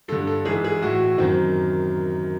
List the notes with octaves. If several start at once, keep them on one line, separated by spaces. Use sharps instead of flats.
G2 D3 A4
A4
G#2 E3 G#4
G#4
A2 E3 F#4
F#2 D#3 C4